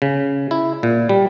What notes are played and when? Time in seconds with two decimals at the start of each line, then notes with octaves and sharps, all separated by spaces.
0.02 C#3
0.51 E4
0.83 A#2
1.09 G3